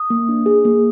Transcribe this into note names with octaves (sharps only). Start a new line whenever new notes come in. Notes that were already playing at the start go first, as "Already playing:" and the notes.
Already playing: D#6
A#3
D4
G#4
A#3